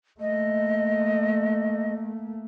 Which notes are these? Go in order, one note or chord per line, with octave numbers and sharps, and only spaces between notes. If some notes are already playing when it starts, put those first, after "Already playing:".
A3 A#3 D#5